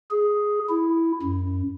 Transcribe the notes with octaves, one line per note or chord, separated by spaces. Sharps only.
G#4
E4
F#2